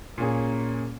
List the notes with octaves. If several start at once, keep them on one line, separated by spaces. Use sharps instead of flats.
A#2 A#3 C#4 G#4